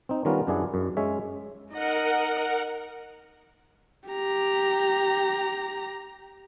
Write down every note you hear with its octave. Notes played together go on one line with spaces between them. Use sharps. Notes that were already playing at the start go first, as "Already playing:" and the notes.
C4 D#4
D#3 G3 B3 C#4 F4 A#4
F#2 D4 E4 G#4 F#5
F#2
G#3 C#4 C#5 E5
D#4 A#4 D#5 F#5
G4 A#5